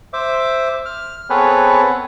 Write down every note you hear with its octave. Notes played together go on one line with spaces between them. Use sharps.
C5 E5 D6
F6
B3 C4 G#4 A4 B4 C#5